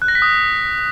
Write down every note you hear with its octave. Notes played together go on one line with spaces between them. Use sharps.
F#6
A#6
B6
D#6